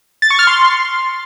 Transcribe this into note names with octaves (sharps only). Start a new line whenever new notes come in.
A6
C#6
F6
C6